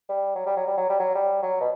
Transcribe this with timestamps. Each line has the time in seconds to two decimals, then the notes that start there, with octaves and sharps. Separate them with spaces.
0.09 G3
0.35 F#3
0.46 G3
0.56 F#3
0.67 G3
0.78 F#3
0.89 G3
1.00 F#3
1.15 G3
1.42 F#3
1.61 B2